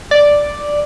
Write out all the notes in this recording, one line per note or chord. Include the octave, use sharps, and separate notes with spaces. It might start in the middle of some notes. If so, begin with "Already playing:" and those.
D5